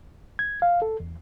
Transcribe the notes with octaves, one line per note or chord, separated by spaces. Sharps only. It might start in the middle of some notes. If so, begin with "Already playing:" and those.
G#6
F5
A4
E2